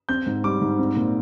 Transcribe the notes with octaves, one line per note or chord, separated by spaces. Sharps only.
C4 G6
G#2
G3 D6
G#2
C4
A#2